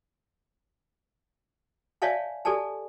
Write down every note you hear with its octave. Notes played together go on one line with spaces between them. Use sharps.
C#5 D5 E5 F5 G#5 A5
G4 A4 D5 G#5 A5